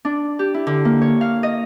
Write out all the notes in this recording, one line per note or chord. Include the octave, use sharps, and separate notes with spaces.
D4
G4
E4
D3
A#3
C#5
F5
D#5